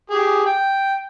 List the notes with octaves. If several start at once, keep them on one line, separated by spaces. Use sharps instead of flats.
G4 G#4
G5